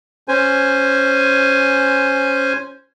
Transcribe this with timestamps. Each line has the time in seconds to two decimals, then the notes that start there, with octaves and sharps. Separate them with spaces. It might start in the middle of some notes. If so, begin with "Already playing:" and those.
0.28 C#4 C5 G#5